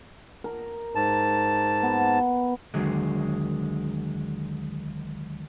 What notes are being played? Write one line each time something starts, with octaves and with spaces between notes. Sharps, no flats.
A#4
G#2 A5
B3
D#2 D3 F#3 G#3